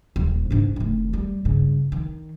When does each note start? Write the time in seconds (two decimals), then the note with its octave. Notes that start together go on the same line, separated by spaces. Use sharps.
0.16 D#1
0.51 G#2 D4
0.76 F1 D#3
1.13 G3
1.45 G2 C#3
1.92 D#3